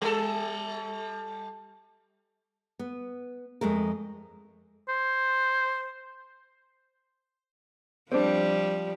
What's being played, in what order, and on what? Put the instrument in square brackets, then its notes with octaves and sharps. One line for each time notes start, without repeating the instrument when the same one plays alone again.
[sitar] G3 A4
[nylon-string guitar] B3
F2 G#3 A3 A#4
[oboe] C5
[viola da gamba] F3 G3 [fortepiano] C4 D4